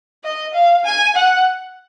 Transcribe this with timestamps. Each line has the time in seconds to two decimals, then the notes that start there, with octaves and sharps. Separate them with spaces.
0.24 D#5
0.54 F5
0.85 G#5
1.16 F#5